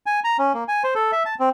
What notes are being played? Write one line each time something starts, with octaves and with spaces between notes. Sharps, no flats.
G#5
A#5
C#4
A#3
G#5
C5
A4
E5
A5
C4